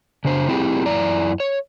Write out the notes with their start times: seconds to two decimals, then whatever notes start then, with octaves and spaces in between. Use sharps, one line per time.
0.25 C#3 D4 C5
0.49 C4 E4 G4 G#4
0.86 F#2 E4 D5 A#5
1.40 C#5